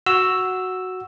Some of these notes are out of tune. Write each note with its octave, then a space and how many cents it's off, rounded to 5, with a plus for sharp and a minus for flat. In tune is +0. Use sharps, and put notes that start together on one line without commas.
F#4 +0 E6 +0